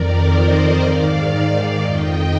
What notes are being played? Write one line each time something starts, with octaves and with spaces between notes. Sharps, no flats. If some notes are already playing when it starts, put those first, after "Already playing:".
Already playing: F2 D#3 A#4 D5
C5 D#5
G#2 D#3 D5 F5
D5 F5
F2 D#3 D#5 G5